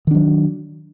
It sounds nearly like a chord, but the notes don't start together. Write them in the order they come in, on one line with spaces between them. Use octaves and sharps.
D#3 D4 F#3